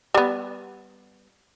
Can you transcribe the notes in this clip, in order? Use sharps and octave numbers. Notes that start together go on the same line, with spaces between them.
G3 B3